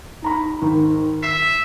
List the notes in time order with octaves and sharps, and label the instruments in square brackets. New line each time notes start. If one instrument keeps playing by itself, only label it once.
[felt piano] D#4 A#5 B5
D#2 G#2
[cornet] E5 [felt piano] C7